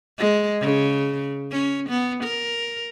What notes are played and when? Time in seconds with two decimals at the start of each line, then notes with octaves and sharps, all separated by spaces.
0.19 G#3
0.61 C#3
1.52 C#4
1.90 B3
2.24 A#4